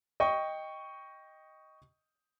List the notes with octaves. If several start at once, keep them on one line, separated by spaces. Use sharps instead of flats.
D#5 G5 C#6